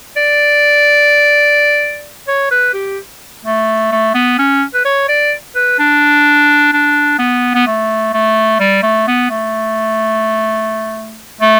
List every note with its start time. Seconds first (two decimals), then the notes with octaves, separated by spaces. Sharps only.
0.16 D5
2.28 C#5
2.51 B4
2.73 G4
3.45 A3
3.92 A3
4.14 B3
4.39 C#4
4.74 B4
4.85 C#5
5.08 D5
5.55 B4
5.79 D4
6.73 D4
7.19 B3
7.55 B3
7.67 A3
8.13 A3
8.59 G3
8.83 A3
9.07 B3
9.30 A3
11.41 A3